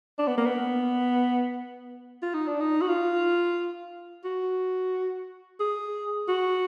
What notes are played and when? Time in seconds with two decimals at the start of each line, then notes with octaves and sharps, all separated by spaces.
0.18 D4
0.28 B3
0.38 A#3
0.46 B3
2.23 F4
2.34 D#4
2.47 D4
2.60 D#4
2.81 F#4
2.89 F4
4.25 F#4
5.60 G#4
6.28 F#4